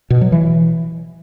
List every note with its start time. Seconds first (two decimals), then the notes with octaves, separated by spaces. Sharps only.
0.10 B2
0.21 F#3
0.32 E3